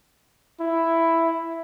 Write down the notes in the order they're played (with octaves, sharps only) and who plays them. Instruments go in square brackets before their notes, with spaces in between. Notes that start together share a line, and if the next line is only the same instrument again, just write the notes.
[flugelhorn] E4